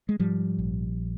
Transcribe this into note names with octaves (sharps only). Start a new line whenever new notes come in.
G#3
G#2 F3 G3
A#1